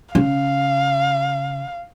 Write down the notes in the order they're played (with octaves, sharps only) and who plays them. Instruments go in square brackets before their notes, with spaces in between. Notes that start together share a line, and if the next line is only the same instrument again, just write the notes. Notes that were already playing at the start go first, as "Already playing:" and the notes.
[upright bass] C#3 [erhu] F5